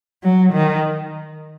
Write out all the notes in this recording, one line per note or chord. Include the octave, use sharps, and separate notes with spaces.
F#3
D#3